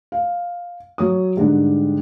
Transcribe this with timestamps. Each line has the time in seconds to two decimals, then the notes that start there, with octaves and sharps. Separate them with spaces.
0.12 F5
0.98 F#3 C#5 D#6
1.37 G#2 D3 G3